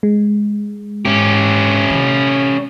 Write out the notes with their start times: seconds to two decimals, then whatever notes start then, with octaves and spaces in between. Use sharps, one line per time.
0.03 G#3
1.05 G#2 C#4 G4
1.90 C3 D#3